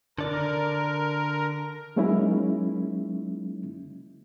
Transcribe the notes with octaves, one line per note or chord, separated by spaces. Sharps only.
D3 A#4 D5
F#3 G#3 A#3 C#4 D#4 E4